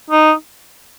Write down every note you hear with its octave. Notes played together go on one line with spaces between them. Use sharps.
D#4